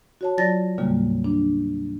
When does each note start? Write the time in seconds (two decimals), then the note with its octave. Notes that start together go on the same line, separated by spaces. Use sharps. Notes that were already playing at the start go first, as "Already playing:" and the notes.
0.21 F#4 C#5 A5
0.38 F#3 F4 D5 A5 A6 A#6
0.78 D#2 A2 C#3 G3 A#3
1.24 D4